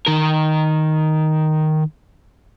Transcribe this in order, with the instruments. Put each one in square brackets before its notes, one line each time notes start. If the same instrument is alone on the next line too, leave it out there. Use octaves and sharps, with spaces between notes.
[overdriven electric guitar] D#3 A#4